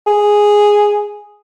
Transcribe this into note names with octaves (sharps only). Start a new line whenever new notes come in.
G#4